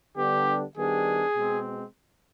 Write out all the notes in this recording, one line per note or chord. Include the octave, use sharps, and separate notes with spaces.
D3 G3 B3 D4 G4
D#3 G3 B3 D4 G#4
B2 G#3 C4